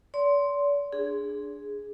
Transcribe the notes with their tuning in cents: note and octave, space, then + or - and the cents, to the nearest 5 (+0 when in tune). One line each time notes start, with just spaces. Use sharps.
D5 -45 C6 +0
D4 +0 G#4 +0